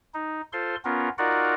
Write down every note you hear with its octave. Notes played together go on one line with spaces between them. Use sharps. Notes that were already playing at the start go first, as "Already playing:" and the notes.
D#4
F4 A4 C5 C6
B3 C#4 F4 A#4
D#4 F4 F#4 A#4 D5 F#5